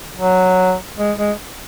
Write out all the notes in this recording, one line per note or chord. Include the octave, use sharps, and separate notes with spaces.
F#3
G#3
G#3